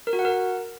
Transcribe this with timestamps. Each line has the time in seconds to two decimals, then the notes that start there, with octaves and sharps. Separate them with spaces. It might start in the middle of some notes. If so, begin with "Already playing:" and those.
0.07 A#4
0.13 F#4
0.19 F#5
0.25 A#4